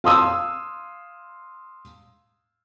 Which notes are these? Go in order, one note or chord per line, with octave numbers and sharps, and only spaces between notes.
F5 C6 D#6 E6